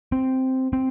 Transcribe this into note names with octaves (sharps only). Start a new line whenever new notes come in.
C4
C4